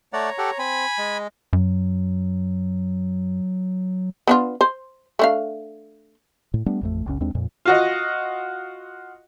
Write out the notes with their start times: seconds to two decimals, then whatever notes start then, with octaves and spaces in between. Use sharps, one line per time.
0.13 A3 C#5 D5 F#5 A#5
0.38 G4 A4 F#5
0.59 C4 G#5 B5
0.98 G#3
1.53 F#2 F#3
4.27 B3 D4 F4
4.61 C5
5.19 A3 D4 F5
6.54 A2
6.66 G3 A3 B3 D4
6.81 A1 F2 A3
7.06 F#1 C#2 C#4
7.20 D#2 G#3 C4 D4
7.35 F2 A#2
7.65 F4 F#4 D#5